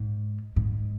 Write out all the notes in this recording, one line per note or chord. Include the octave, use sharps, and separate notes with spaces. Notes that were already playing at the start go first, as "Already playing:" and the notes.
Already playing: G#2
G#2